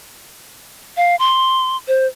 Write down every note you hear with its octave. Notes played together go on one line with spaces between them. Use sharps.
F5
C6
C5